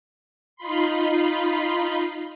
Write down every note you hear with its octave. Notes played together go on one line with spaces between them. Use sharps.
D#4 F4 B5 C6